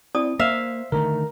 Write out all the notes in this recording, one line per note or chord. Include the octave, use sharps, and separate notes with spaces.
C4 E4 D5 A5 D#6
A#3 C5 E5 F5
D3 D#3 A3 A#4 A#5